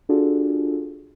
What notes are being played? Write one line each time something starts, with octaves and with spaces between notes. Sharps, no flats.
D4 F4 F#4 G#4 A4